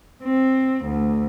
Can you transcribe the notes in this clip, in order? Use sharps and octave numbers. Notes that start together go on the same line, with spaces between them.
C4
D2